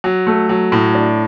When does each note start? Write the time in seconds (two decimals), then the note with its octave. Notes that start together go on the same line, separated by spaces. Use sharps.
0.04 F#3
0.27 A3
0.49 F#3
0.72 A2
0.95 D4